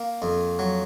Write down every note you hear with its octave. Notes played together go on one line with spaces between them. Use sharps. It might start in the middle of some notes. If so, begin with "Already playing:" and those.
Already playing: A#3
F2
F#3